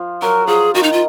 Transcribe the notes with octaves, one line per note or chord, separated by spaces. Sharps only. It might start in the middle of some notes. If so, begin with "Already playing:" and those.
Already playing: F3
F#3 A#4
F3 G#4
D#3 F#4
D#4
F4